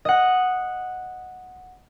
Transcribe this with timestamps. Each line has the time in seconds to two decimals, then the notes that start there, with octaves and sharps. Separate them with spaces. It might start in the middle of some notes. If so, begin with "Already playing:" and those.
0.05 D#5 F#5